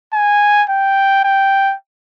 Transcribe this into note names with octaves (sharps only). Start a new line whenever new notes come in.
G#5
G5
G5